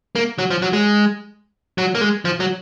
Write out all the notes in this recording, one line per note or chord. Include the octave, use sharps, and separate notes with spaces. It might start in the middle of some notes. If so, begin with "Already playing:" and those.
A#3
F#3
F3
F#3
G#3
F#3
A#3
G#3
F3
F#3